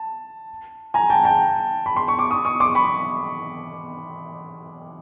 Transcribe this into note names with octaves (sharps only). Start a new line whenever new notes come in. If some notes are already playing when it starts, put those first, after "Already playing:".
Already playing: A5
G#5 A#5
G5 A5
G5 A5
B5
C6
C#6
D6
C#6 D#6
C#6 D#6
C6 D6
B5 C#6